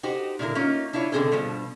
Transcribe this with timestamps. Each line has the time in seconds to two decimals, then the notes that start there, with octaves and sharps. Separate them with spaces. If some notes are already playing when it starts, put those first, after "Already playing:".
0.03 D#4 F#4 G4 C5
0.39 A#2 D3 E4 A#4
0.55 A#3 C#4 D#4 F4
0.93 D4 E4 F4 C#5
1.12 B2 D3 F3 C4 G#4 A4
1.32 G2 B2 F3